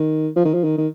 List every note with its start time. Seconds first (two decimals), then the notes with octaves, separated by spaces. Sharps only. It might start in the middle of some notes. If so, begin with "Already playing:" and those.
Already playing: D#3
0.36 F3
0.45 D#3
0.54 F3
0.64 D#3
0.78 D#3